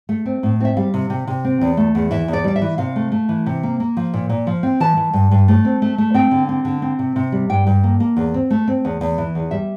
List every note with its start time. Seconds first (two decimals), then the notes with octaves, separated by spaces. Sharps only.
0.09 A3
0.26 C4
0.43 A2
0.60 C4 E5
0.77 G3 F5
0.94 C3
1.10 C3
1.27 C3
1.45 C4
1.61 E2
1.77 A3
1.95 E2
2.11 E3 E5
2.28 E2
2.33 D5
2.44 G3 D5
2.56 E5
2.62 E3
2.78 C3 F5
2.96 A3
3.12 A3
3.29 E3
3.46 C3
3.63 A#3
3.80 A#3
3.97 F3
4.14 A#2
4.29 A#2
4.47 F3
4.63 C4
4.80 E3 A5
4.97 E3
5.13 G2
5.31 G2
5.48 A3
5.65 C4
5.82 A3
5.98 A3
6.14 C4 G5
6.31 D3
6.49 C4
6.65 D3
6.82 C4
6.99 C3
7.16 C3
7.32 G3
7.49 G2 G5
7.67 G2
7.84 A#3
8.00 A#3
8.17 E2
8.34 C4
8.50 A3
8.68 C4
8.85 E2
9.01 E2
9.18 E3
9.35 E2
9.51 G3 E5